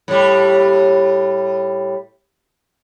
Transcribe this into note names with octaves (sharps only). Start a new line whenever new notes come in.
A2 G3